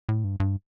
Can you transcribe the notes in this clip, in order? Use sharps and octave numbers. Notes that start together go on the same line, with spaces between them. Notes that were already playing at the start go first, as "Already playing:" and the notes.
A2
G2
G2